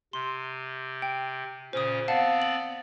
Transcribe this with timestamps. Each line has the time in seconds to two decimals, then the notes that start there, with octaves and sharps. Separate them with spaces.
0.13 C3 C6
1.02 G5
1.73 A#2 C#3 C#4 C5 D#6
2.08 B3 C4 D5 F5 F#5 A5
2.42 F#7